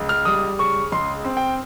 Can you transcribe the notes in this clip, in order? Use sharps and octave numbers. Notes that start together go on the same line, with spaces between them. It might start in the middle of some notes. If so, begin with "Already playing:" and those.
Already playing: C#2
F6
G3 D#6
C#3 C#6
C#2 C6
C4
G5